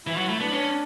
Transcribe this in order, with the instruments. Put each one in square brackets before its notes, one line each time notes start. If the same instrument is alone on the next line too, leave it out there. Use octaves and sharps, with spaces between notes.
[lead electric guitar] E3 [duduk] E4
[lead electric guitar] F#3 [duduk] F#4
[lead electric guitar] A3 [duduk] E4
[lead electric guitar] B3 [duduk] D4
[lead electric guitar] C#4